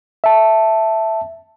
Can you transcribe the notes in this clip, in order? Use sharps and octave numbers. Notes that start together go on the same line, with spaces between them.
E5 A5